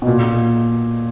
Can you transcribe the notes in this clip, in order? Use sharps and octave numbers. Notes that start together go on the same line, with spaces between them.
B2
A#2